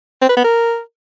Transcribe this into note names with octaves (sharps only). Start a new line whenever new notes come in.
C4
B4
B3
A#4